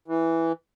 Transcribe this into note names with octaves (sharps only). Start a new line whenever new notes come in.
E3